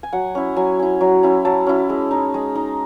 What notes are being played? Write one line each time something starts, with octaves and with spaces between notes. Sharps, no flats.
G#5
F#3 F#5
C#4 E4
F#3 G#5
C#4 E4
F#3
C#4 E4
F#3 A5
C#4 E4
G#3
D#4
G#3
D#4